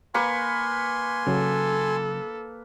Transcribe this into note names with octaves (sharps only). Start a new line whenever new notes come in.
A#3 B4 G#5 C6 C#6
C#3 F#3 A4